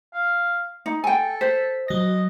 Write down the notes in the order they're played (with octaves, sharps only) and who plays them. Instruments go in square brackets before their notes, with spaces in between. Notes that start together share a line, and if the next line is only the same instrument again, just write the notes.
[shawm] F5
[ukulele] D#4
[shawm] A4 [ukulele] G5 G#5
[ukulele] C5 [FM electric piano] B6
[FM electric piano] F#3 A#6 [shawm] D#5